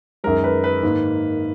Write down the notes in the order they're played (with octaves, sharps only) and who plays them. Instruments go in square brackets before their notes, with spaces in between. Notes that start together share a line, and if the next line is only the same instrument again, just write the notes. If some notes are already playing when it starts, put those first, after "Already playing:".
[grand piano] F#2 D#3 G#3 A#4
B4
B4
G#2 D#3 A#3